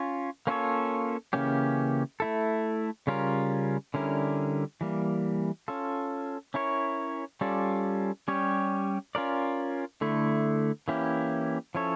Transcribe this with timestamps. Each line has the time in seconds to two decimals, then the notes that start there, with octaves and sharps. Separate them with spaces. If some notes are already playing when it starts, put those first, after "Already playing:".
Already playing: C#4 F4 C#5
0.47 A#3 C#4 F4 A4 C#5
1.33 C#3 E3 A#3 C#4 G4
2.20 A3 E4 A4
3.07 C#3 G3 C#4 F4 A#4
3.94 D3 G3 C#4 E4 A#4
4.81 E3 G3 A#3
5.68 C#4 F4 A4
6.54 C#4 E4 A#4 C#5
7.41 G3 C#4 F4 A4 D5
8.28 G3 C#4 G4 C#5
9.15 C#4 F4 A#4 D5
10.01 D3 A3 E4
10.88 E3 A#3 C#4 E4 G4
11.75 F3 C#4 E4 A4 C#5